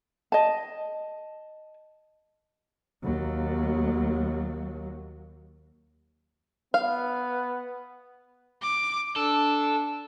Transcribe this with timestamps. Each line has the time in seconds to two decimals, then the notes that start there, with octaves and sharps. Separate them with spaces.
0.32 D#5 A5
3.03 D#2 F#3
6.74 B3 F5
8.62 D6
9.16 D4 A4